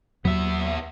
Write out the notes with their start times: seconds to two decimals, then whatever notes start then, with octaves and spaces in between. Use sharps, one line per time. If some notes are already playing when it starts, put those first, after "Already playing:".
0.25 D#2 F#3 B3 E5